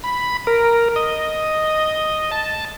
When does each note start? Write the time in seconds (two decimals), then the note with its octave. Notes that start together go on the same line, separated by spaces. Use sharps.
0.04 B5
0.47 A#4
0.96 D#5
2.31 A5